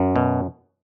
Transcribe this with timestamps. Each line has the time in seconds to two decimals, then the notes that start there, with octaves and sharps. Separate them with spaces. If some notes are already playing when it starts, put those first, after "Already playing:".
Already playing: F#2
0.16 B2